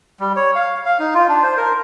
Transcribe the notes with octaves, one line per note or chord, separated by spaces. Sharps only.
G3
C#5
F5
F5
D#4
F4
D4
C5
A#4